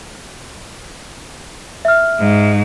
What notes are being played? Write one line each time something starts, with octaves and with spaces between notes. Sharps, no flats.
E5 F6
G#2